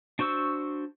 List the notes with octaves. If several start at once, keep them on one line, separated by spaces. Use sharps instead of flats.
D4 F#4 C5 C#6 E6